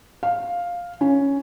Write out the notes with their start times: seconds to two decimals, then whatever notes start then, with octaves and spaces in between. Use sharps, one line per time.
0.23 F5
1.01 C#4